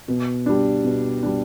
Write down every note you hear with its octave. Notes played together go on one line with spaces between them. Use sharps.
B2
G3 D4
B2
G3 D4